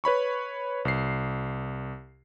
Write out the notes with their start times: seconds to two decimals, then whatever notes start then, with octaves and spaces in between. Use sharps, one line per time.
0.04 B4 C#5 B5 C#6
0.85 C2 C7